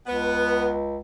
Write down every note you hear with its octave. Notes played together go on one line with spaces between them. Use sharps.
C#2 B3